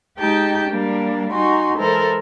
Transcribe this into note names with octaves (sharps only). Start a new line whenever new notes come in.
G#3 D#4 G4 G5 A5 G6
G3 A#3 D4
D#4 F#4 G#5 C6
E3 G#3 A4 A#4 C5